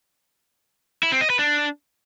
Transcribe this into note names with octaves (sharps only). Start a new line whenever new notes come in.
E4
C4
D#5
B4
D4